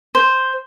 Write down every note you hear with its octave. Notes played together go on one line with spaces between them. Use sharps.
C5